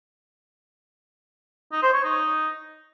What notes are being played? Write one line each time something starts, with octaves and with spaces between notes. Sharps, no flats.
D#4
C5
C#5
D#4